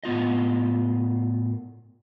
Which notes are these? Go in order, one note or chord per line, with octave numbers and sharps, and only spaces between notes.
A2 B3 F4 D#5